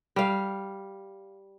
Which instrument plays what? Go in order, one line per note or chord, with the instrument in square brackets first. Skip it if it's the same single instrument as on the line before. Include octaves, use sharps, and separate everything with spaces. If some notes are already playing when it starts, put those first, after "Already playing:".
[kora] G3 F5